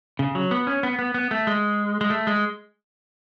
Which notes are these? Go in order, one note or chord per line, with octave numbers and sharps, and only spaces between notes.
C#3
F#3
B3
C#4
B3
B3
B3
A3
G#3
G#3
A3
G#3